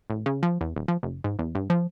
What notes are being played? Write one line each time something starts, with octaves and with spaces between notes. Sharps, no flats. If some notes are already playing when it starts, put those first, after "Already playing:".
A1
C#3
F3
E2
D#1
F3
F#1
G#2
E2
G2
F3